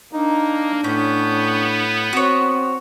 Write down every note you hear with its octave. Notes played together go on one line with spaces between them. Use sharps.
A#3 D4 D#4
A2 B3 C#4 G6
C4 F#4 C#5